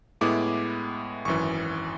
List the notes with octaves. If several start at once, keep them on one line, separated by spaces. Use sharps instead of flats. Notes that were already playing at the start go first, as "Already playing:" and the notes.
A2 G#3 B3 E4 D6
G#1 F#2 E3 C#6